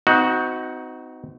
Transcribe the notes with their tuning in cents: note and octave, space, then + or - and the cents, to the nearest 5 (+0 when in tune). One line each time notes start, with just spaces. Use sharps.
C4 -35 D#4 +20 F#4 +0